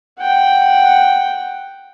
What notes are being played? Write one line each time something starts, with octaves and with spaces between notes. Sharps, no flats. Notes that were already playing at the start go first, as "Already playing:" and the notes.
F#5 G5